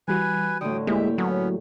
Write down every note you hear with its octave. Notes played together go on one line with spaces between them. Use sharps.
E3 G3 F#4 B4 G#5
A2 D3 G5 D#6
G#3 A#3 E4 G4 E5
F#3 B3 C#4